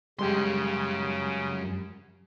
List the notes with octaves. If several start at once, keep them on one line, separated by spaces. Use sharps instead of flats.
F#2 C#3 G3 G#3 G4 C6